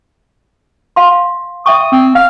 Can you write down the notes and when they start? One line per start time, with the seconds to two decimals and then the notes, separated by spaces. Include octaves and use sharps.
0.96 F5 C6
1.66 E5 G5 C#6 D#6
1.92 C4
2.15 F5 F6